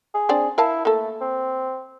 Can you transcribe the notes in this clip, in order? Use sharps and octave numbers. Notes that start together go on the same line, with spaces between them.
G#4
C4 D4 D5
E4 A#4 F5 A5
A3 A#3 A4
C4